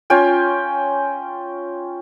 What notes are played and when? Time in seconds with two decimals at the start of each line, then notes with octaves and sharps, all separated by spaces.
0.10 C#4 F4 G5 G#5